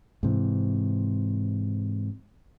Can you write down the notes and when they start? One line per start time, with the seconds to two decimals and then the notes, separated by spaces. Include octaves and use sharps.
0.23 G#2 C3 E3